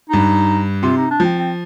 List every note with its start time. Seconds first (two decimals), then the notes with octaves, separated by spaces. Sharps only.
0.10 G2 D#4
0.83 C3 F4
0.97 D#4
1.11 D4
1.20 F3 C4
1.38 C4